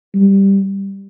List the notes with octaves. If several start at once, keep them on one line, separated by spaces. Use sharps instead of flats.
G3